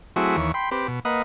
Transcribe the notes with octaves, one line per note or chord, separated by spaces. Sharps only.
F#3 A3 C4 E4 F#4 G#4
D#2 E3 C#5
G5 B5 C6
C4 G4 B4
B2
A#3 B4 D#5 F#5